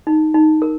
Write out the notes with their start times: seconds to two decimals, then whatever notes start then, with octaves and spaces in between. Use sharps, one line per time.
0.07 D#4
0.34 D#4
0.62 A#4